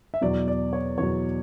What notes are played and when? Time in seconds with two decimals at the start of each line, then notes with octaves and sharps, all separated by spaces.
0.14 E5
0.21 E2 B2 F#3 D5
0.48 D5
0.73 C#5
0.98 E2 B2 F#3 C#5